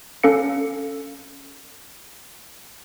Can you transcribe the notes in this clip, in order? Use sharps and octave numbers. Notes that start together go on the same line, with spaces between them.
C#4 A4 F5 C#7